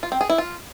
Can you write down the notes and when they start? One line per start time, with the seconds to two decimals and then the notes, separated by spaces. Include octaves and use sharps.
0.03 F4
0.12 C4
0.21 G#4
0.29 E4
0.38 F4